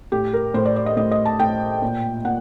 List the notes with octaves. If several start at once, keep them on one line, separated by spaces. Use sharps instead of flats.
A2 G4
A#4
A2 C5
D5
D5
D#5
A2 D#5
D#5
A5
A2 G5
A#2
A#2 F#5